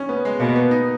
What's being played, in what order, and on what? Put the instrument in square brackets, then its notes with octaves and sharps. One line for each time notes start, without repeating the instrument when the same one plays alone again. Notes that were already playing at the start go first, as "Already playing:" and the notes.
Already playing: [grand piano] C#4 D#4
B3
G#3
[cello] B2 [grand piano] A#3
[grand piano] B3
D#4